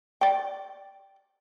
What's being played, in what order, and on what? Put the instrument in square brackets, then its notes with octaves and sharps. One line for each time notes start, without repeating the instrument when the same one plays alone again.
[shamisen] D5 G5